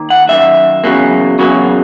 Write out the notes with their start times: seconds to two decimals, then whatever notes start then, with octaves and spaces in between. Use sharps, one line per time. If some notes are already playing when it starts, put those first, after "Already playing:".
Already playing: D#3 A#3
0.10 F#5
0.28 F#2 D#3 A#3 E5
0.84 E2 C#3 F#3 A#3
1.39 E2 C#3 F#3 A#3